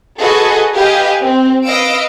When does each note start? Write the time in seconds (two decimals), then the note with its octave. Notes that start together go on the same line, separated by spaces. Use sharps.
0.19 F#4 G#4 A4 B4 D#5
0.74 G4 B4 D#5 F5 G#5
1.21 C4
1.65 B4 D#5 F5 E6 D7